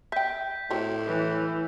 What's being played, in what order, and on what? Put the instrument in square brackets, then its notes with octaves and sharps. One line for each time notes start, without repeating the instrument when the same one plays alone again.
[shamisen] E5 G5 [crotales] G6 B6
[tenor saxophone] A2 [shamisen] C4 F#4 A#4
[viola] E3